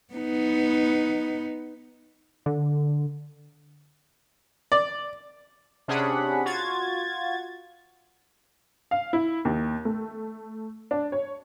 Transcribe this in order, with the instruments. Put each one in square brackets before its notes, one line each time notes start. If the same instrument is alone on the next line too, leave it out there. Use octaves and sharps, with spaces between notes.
[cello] B3 D#4
[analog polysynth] D3
[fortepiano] D5
[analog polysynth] C3 C#4 D4 G#4 F#5 B5
F4 F#4 G#6 A6
[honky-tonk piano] F5
E4
D#2
A3
D4
C#5